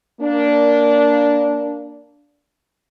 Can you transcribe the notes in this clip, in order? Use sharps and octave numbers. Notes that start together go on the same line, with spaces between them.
A#3 D4